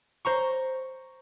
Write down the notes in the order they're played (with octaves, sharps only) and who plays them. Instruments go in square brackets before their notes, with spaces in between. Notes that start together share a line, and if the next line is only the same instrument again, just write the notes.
[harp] C5 A#5 C#6